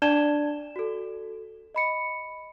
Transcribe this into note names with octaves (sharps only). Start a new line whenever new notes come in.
D4 D5 A5 G#6 E7 G7
F#4 A4
D#5 B5 C#7